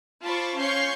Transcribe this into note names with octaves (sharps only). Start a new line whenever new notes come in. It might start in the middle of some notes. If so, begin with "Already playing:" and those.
F4 C5 A5 B5 C#6 D6
C#4 F5 C6 C#6 G6